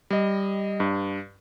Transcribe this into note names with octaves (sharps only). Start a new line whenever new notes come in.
G3 D#5
G2